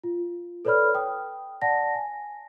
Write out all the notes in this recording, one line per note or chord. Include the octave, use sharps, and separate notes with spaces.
F4
A4 B4 C#5 D5 B5 F6
G5 D#6
D5 F#5 A5 A#6
G#5